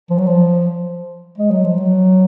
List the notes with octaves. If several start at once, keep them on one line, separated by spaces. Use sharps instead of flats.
F3
F#3
F3
G#3
F#3
F3
F#3